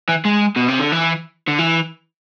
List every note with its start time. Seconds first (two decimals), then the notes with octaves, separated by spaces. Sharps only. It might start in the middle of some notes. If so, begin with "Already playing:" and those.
0.09 E3
0.25 G#3
0.56 B2
0.68 C3
0.80 D3
0.92 E3
1.47 D3
1.58 E3